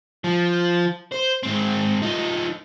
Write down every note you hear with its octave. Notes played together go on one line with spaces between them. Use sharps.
F3
C5
G#2 C4
F3 D#4